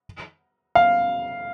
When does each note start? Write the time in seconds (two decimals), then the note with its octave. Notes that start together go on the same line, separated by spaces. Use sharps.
0.75 F5